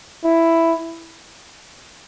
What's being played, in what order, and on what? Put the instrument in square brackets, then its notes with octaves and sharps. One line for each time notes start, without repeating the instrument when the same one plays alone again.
[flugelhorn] E4